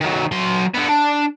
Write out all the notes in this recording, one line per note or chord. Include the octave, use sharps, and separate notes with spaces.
D#3 F#3
F#3 C6
D3 B3
D4